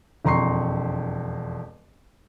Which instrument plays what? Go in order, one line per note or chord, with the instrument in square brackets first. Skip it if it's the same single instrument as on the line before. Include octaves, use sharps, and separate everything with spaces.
[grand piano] E1 F2 A#5 C6 C#6 C7